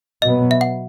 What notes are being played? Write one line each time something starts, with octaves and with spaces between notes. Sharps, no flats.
B2 F#3 B3 D#5
E5
F#5